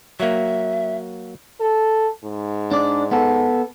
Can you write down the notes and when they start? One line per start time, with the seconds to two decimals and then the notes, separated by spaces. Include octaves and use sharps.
0.20 F#3 A#3 E5
1.60 A4
2.24 G#2
2.71 D4 D5
3.11 B3 A4